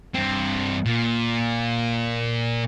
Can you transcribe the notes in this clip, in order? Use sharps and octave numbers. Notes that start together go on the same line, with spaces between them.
G2 C4
A#2